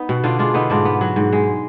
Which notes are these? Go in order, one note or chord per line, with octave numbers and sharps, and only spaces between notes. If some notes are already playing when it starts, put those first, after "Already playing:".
Already playing: B3 D#4
B2
D3 D4 F4
G#3 D4 F4
D3 B3 D#4
G#2 D4 F4
B3
F#3
G#2
G#3